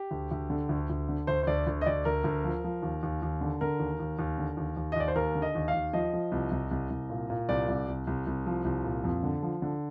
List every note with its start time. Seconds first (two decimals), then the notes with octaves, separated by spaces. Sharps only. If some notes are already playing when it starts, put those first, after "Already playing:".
Already playing: G4
0.11 D2
0.31 D2
0.50 D3
0.69 D2
0.90 D2
1.09 D3
1.27 D2 C5
1.43 C5
1.47 D2 D5
1.67 D2
1.81 D#5
1.86 D2 D5
2.05 D2 A#4
2.24 D2
2.44 F3
2.64 F3
2.82 D#2
3.03 D#2
3.22 D#2
3.41 D3
3.61 D3 A#4
3.80 D#2
4.00 D#2
4.19 D#2
4.38 D3
4.57 D#2
4.77 D#2
4.92 D#5
4.96 D#2 D5
5.08 C5
5.16 D#2 A#4
5.35 D3
5.42 D#5
5.55 D#2
5.68 F5
5.74 D#2
5.93 F3 D#5
6.13 F3
6.32 C2
6.51 C2
6.71 C2
6.90 C2
7.10 A#2
7.30 A#2
7.49 C2 D5
7.68 C2
7.88 C2
8.07 C2
8.26 C2
8.46 F3
8.65 C2
8.84 A#2
9.04 F2
9.23 D3
9.43 F3
9.62 D3